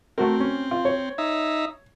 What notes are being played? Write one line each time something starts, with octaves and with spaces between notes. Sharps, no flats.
A3 C4 F#4 A#4
C#4
F4
C#5
D#4 E5